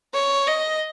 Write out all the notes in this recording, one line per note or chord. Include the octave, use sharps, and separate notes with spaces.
C#5
D#5